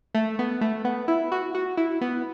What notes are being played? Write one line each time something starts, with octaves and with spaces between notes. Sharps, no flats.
A3
B3
A3
B3
E4
F#4
F#4
E4
B3